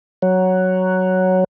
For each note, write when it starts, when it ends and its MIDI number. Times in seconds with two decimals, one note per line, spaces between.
0.22 1.44 54